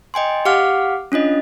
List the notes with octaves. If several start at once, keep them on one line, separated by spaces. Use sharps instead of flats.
D#5 G5 G#5 C6
G4 F5 F#5 D6 F6
C#4 D4 F4 D#5